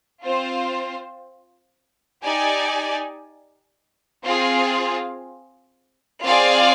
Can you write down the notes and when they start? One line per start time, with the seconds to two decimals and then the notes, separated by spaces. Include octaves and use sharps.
0.22 C4 F4 C5
2.23 D#4 G4 D5 G#5
4.23 C4 F4 G#4
6.24 C4 F4 G#4 D5 F5